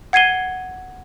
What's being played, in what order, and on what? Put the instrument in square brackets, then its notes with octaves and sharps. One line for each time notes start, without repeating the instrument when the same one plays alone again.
[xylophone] F#5 G#6 C7 D#7 G7